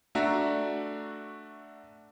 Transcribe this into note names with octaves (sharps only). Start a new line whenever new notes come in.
A3 D4 F#4 E5 A#5